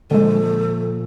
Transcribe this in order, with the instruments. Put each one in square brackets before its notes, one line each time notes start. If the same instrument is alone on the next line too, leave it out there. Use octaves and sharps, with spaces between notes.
[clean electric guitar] A#2 [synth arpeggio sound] D3 G#3 [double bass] F3 [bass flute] A4